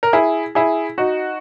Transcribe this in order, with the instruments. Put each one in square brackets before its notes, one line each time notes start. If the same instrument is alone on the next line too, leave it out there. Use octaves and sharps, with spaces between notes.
[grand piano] A#4
E4 G#4
E4 G#4
D#4 F#4